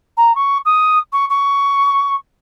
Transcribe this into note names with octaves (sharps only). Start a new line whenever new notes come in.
A#5
C#6
D#6
C#6
C#6